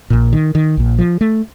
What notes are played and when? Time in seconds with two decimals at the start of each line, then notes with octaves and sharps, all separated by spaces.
0.10 A#1 A#2
0.33 D#3
0.55 D#3
0.77 A#1 A#2
0.99 F3
1.21 A3